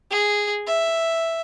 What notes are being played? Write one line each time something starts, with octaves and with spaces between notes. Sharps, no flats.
G#4
E5